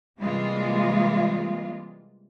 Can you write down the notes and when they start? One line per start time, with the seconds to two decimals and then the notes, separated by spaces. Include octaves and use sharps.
0.20 C3 E3 G3 G#3 A#3 F4